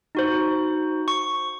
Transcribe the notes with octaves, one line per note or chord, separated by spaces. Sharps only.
D#4 F#4 C5
C#6